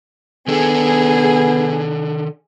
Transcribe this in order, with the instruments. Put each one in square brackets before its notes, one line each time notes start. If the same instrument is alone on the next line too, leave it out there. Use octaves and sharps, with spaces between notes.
[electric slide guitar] D#3 D4 A4 [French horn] B3 [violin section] G#4